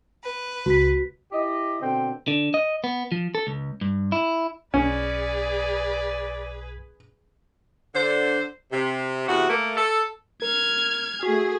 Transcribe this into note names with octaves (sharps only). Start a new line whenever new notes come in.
B4
C#2 F#4 B6
E4 G4 D#5
B2 D3 C4 G5
D3
D#5
B3
F3
A4
C#2
G2
E4
B1 C#4 G#4 B4 D5
D3 C5
C3
E2 C3 F#4
A3 A#3
A4
A#4 F6 G#6
A3 F#4 G#4